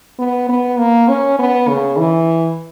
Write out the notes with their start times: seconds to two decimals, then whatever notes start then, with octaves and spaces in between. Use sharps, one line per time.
0.19 B3
0.49 B3
0.79 A#3
1.08 C#4
1.39 B3
1.68 C#3
1.98 E3